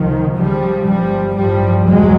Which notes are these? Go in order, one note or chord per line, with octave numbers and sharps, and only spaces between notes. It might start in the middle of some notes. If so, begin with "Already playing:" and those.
Already playing: C#2 C3 D#3 F3
C#2 C#3 F3 G3
G1 G2 F3 G3
A1 G2 F3 G3
F#1 E2 B2 F#3 G#3